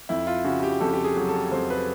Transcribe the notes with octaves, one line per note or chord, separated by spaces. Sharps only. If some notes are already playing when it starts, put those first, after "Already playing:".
F2 E4
F4
C#3 F#4
G4
F2 A4
G4
G#4
F#3
A4
F2 C5
B4